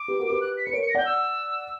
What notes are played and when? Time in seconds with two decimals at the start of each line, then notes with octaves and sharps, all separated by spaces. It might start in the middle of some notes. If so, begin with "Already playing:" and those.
Already playing: D6
0.08 G4 B4
0.19 F#4 A#4
0.30 G4 B4
0.41 F#6
0.57 B6
0.65 B4 C#7
0.73 A#4 C#5 D7
0.81 C#7
0.89 A#6
0.95 D5 F#5 G6
1.05 E6